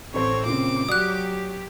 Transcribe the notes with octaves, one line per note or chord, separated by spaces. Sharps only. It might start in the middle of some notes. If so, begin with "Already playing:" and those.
A1 C4 A4 C5 C#5
A#2 C#3 D6
F#3 F#4 G4 D5 D#6 F#6